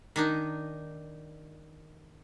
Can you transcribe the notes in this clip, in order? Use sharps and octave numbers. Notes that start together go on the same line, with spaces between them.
D#3 D4 D#4